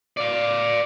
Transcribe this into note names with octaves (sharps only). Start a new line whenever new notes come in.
D5 F5